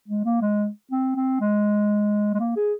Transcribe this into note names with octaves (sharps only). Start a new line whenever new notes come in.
G#3
A#3
G#3
C4
C4
G#3
G#3
A#3
G#4